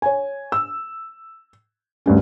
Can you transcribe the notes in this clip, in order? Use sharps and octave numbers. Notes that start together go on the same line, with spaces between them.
C#5 G#5
E6
D2 G2 C#4